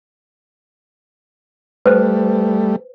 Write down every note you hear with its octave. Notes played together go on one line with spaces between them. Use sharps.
G3 A3 B4 C5